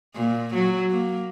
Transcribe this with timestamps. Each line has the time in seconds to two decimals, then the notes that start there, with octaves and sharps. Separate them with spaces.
0.15 A#2
0.55 F#3
0.91 A#3